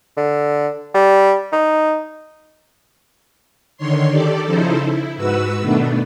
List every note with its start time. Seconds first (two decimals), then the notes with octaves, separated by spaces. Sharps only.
0.17 D3
0.94 G3
1.52 D#4
3.77 D3 D#3 C#5 C6
4.10 D#3 G4 A4 D5
4.46 C#3 F3 D#4 E4 A4 C5
4.85 E4
5.16 G#2 F#4 B4 E6
5.60 B2 D#3 A3 B3 D4